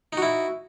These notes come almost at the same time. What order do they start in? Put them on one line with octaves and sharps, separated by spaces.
D#4 F#4 E4